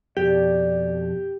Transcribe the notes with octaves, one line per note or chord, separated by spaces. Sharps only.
F2 B2 G4 D5